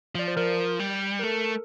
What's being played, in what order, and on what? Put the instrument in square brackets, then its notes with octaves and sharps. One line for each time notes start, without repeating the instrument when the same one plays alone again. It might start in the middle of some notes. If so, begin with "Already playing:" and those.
[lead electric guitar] F3 [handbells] D5
[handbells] C5
[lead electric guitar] F3 [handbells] A#4
[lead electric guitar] G3
[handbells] A#4
[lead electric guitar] A3 [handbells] A4